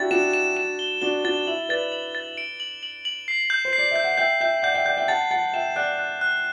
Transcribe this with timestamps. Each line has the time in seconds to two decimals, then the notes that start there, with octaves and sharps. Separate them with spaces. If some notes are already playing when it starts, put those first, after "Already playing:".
Already playing: D4 E4 F#4 G4 A6
0.11 D4 F#4 E7
0.33 E7
0.57 E7
0.79 G7
1.01 D4 F#4 G7
1.24 D4 F#4 A6
1.47 E4 F#7
1.69 B4 D5 A6
1.92 F#7
2.15 A6
2.37 D7
2.60 F#7
2.83 F#7
3.05 F#7
3.28 C7
3.50 G6
3.65 C5
3.73 C7
3.78 D5
3.91 E5 G6
4.04 F#5
4.18 E5 G5 G6
4.41 E5 G5 G6
4.63 D5 F#5 G6
4.75 E5 G5
4.85 D5 F#5 G6
4.97 E5 G5
5.08 F#5 A5 A6
5.30 F#5 A5 A6
5.54 E5 G5 E7
5.76 D5 F#5 F#6
5.99 F#6
6.21 F#6